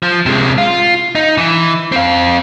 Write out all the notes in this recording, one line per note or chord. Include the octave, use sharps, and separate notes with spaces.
F3
C3 G#3
F4
D#4
E3
C4 F5